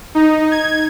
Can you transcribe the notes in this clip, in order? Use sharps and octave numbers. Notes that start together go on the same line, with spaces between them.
D#4
G#6